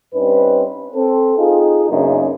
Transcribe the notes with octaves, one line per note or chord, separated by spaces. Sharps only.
G2 C4 C#4 D#4 B4
C4 A4
D#4 F4 G#4
F#2 C#3 A#3 B3 D4 D#4